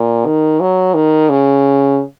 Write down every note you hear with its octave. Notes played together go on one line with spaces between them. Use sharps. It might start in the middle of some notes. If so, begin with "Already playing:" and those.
Already playing: A#2
D#3
F#3
D#3
C#3